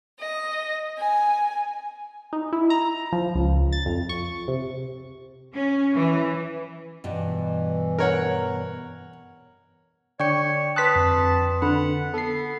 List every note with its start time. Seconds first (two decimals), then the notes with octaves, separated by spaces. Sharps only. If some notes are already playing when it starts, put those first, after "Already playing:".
0.19 D#5
0.98 G#5
2.33 D#4
2.53 E4
2.70 A#5
3.12 F3
3.35 C#2
3.72 A6
3.86 F2
4.09 C#6
4.48 C3
5.53 C#4
5.95 E3
7.04 G2 B2 E3
7.99 A#4 C#5 F#5
10.20 D3 C#5 D5 G5 C#6 C#7
10.76 B4 A5 C6 D#6 F#6 B6
10.96 F2
11.62 D3 F#5 B5
12.14 B3 A4 C7